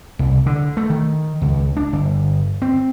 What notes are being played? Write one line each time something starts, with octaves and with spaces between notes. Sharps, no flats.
C2
D3
A3
D#3
C#2
D4
G1
C4